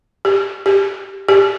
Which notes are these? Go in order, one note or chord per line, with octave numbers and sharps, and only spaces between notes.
G4
G4
G4